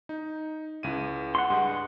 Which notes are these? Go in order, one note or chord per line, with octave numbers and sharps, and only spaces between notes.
D#4
C#2 E4 D#7
F#5 C6
G2 G#3